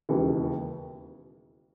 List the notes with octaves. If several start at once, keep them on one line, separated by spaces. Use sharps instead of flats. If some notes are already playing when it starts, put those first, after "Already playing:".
E1 D#2 C#3 E3